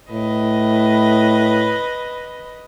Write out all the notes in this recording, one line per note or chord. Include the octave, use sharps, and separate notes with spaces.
A2 B4 D#5